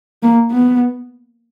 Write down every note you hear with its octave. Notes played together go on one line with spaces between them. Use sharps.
A#3
B3